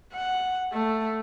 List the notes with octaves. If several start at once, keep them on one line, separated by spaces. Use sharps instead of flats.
F#5
A3